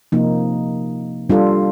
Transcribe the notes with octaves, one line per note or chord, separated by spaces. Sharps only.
C3 F3 A#3 D#4
G3 D4 F4 A4